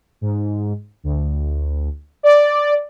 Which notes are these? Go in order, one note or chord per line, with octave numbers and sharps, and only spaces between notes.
G#2
D2
D5